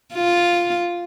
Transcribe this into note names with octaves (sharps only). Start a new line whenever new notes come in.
F4